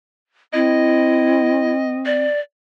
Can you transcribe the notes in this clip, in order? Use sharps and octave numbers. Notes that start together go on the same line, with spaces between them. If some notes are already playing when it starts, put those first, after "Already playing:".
C4 E4 D#5
D5